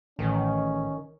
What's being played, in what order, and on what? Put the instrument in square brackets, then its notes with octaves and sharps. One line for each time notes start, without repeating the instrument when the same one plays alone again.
[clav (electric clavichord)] A1 [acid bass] D#3 [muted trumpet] C#4